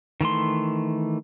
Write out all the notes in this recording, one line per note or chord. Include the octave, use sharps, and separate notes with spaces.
D#3 E3 A3 C6